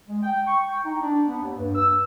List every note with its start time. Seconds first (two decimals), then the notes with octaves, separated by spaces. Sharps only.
0.09 G#3
0.22 G5
0.47 C#6
0.67 G5
0.85 D#4
1.02 D4
1.27 B3
1.42 D#2
1.58 G2
1.75 E6